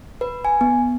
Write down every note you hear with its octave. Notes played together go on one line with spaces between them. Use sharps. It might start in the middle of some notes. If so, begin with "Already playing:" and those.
B4
G#5
B3